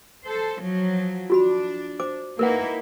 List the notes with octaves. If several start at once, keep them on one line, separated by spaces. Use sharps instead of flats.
A4 C5
F3 F#3
D4 F4 F#4 B5
C5 D6
A#3 D#4 E4 A#4 B4 F#5